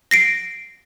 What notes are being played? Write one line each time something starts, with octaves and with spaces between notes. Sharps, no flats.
A#6 C7 D7